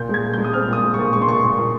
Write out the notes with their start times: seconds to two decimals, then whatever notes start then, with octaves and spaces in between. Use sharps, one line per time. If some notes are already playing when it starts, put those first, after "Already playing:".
Already playing: A#2 G6
0.09 G#3 G#6
0.24 A#2
0.33 G#3 G6
0.44 D#6
0.53 C4 F6
0.68 A#2 D#6
0.83 G#3
0.94 A#2 C#6
1.13 G#3 C#6
1.22 C6
1.28 A#2 C#6
1.44 A#2
1.58 A#2